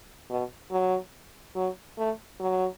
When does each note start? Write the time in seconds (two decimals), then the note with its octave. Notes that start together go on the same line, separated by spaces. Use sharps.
0.30 B2
0.71 F#3
1.55 F#3
1.98 A3
2.40 F#3